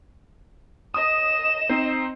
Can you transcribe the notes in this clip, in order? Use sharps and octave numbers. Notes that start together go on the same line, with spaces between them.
D#5 D#6 E7
C4 D#4 C5